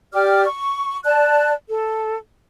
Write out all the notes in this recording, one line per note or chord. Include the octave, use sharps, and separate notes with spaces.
G4 D5 D6 F6
C#6
D5 A5 F#6
A4